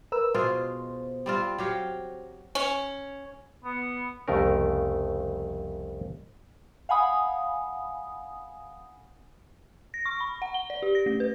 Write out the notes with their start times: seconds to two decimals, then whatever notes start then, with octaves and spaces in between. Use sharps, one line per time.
0.12 A#4 B4 E6
0.34 B2 G#3 F4 C5
1.26 G3 C4 F4
1.58 F#3 G4 F5
2.55 C#4
3.64 B3
4.28 C2 F2 C#3 A3 A#4
6.89 F5 F#5 G#5 B5 D#6
9.94 A#6
10.06 C#6
10.20 B5
10.42 F#5
10.54 G7
10.70 D5
10.82 G4
10.95 A#6
11.06 A3
11.20 B4